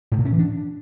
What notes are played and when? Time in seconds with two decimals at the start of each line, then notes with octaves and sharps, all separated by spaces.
0.12 G#2
0.18 A2
0.25 C#4
0.32 E3
0.39 D4